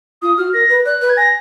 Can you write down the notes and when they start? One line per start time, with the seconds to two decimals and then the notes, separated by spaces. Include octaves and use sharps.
0.22 F4 D#6
0.38 F#4 F6
0.53 A#4 A#6
0.70 B4
0.86 D5 F#6
1.01 B4
1.10 G#6
1.17 G#5 A#6